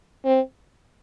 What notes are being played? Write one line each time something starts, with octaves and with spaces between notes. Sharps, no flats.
C4